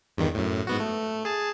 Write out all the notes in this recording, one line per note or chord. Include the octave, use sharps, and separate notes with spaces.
E2 G2 D#3
F#2 A2
G#2 B3 F#4
A3
G#4 A5